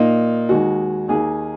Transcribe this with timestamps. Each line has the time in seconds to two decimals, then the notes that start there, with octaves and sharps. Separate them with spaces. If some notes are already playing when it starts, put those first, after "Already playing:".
Already playing: A#2 A#3 D#4
0.49 D#2 D#3 G#3 F#4
1.08 D#2 D#3 A#3 G#4